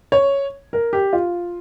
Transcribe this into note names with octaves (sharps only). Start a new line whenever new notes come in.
C#5
A#4
G4
F4